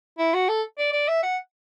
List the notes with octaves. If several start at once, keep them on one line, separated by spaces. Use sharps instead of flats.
E4
F#4
A4
D5
D5
E5
F#5